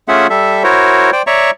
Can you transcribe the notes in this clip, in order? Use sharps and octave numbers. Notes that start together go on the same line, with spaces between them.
A3 C#4 F4 G#4 E5 F#5
G3 A4 E5
E4 F#4 A#4 C5 C#5
C5 D5 G5
C#5 D5 E5 A#5 C#6